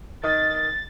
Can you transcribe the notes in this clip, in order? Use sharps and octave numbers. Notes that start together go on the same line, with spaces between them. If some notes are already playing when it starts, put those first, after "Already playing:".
D#3 A6